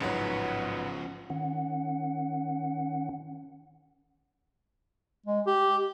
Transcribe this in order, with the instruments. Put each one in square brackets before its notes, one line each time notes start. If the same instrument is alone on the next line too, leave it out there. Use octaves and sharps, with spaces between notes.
[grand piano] A1 G#2 F#3 [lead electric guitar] C#3 F3 [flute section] B4 C#5 F#5
[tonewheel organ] D#3 C#4 F#5
[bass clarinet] G#3
G4